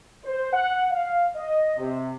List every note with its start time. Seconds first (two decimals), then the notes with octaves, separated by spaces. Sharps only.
0.24 C5
0.53 F#5
0.91 F5
1.35 D#5
1.77 C3